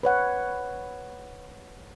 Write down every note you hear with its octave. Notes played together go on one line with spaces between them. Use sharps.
B4 C#5 F#5